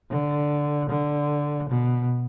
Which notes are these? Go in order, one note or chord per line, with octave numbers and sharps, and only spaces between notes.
D3
D3
B2